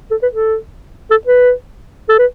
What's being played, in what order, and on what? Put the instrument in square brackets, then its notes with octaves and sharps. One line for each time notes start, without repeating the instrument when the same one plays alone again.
[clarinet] A4
B4
A4
A4
B4
A4
B4